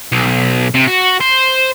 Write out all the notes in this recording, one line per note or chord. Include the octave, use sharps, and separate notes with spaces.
B1
C3
F#4
C5